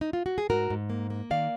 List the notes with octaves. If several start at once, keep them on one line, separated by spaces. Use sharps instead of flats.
D#4
F4
F#4
G#4
G#2 F#4 A#4
G#2
A#3
A#3
D#3 D5 F5